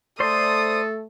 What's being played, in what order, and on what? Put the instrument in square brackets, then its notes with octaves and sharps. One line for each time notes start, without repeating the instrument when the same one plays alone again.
[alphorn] A3 [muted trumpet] A4 [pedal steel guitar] C5 D5 C6 [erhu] D#6